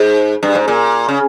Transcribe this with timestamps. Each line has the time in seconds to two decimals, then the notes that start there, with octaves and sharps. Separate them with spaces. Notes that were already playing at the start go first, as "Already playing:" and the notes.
Already playing: G#2
0.43 G2
0.55 G#2
0.68 A#2
1.08 C#3